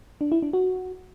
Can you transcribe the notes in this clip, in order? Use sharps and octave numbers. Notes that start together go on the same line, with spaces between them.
D4
E4
D4
F#4